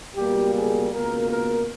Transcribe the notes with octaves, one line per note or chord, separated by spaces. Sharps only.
C#2 B2 G3 A#3 G4
G#4
C#2 B2 A#3 A#4
A#4